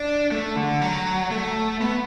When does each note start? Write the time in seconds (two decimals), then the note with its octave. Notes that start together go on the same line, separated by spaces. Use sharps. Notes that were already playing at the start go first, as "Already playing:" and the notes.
Already playing: D4
0.32 A3
0.56 D3
0.82 F#3
1.31 A3
1.82 B3